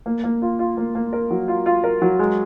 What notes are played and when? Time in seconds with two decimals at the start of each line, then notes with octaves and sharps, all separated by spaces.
0.06 A#3
0.24 A#3
0.42 F4
0.59 F4
0.77 A#3
0.95 A#3
1.13 A#4
1.30 F#3
1.48 F4
1.66 F4
1.84 A#4
2.02 F#3
2.19 G#3